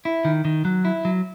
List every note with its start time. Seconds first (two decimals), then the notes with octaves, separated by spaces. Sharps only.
0.05 E4
0.25 D#3
0.45 D#3
0.65 F#3
0.85 E4
1.05 F#3